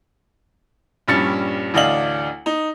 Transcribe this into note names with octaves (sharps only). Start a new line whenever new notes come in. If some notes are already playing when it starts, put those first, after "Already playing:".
A#1 G2 G3 C#4 A6 C#7
A1 D2 D4 D#5 F5 F#7
D#4